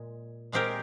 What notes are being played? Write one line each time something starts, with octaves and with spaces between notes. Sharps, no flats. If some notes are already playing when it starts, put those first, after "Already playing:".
Already playing: A#2 G#3
A#2 G#3 C4 G4 A#4